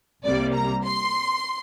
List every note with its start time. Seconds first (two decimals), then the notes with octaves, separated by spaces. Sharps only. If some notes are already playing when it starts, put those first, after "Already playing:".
0.24 C2 C3 G3 A#3 D5
0.54 A#5
0.84 C6